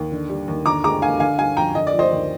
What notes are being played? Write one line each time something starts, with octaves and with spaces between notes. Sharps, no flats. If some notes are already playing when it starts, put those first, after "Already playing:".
Already playing: D#2
D3
G3
D#2
D3 A#5 D6
G#3 A#5 D6
D2 F5 G#5
D3 F5 G#5
G3 F5 G#5
F2 G5 A#5
D3 D#5
D5
F3
C5 D#5
D#2